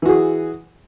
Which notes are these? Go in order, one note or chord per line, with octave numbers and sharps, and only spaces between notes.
E3 F#4 G#4